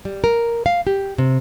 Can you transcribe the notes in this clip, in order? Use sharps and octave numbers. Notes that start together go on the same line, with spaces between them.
G3
A#4
F5
G4
C3